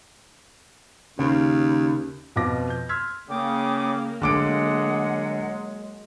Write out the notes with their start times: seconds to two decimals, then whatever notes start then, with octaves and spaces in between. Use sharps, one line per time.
1.19 D#2 C#3
2.36 F2 B2 F4 D6 A#6
2.70 G6
2.89 C6 E6 F6 G#6 B6
3.29 C#3 A#3 G5 D6 D#6
4.22 D3 F#3 G#3 F#5 D6 D7